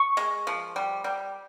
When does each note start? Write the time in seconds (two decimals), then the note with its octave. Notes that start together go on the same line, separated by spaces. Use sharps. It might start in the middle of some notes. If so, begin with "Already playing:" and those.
Already playing: C#6
0.17 G#3
0.47 F3
0.76 G3
1.04 G3